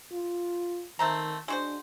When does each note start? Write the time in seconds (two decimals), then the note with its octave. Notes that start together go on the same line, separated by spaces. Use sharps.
0.12 F4
0.99 D#3 A3 C4 A#5
1.48 G#3 D4 F#4 C5